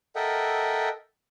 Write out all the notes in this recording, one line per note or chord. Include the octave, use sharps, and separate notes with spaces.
A4 A#4 D#5 E5 F#5 G5